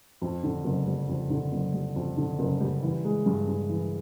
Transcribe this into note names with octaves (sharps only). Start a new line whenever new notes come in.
F2
D3
F#1
G3
F2
D3
F#1
G3
F2
D3
F#1
G3
E3
G#3
G2
G2
E3